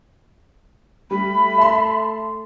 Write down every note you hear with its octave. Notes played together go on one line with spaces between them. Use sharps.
G3 A3 B5
E5 A5 C6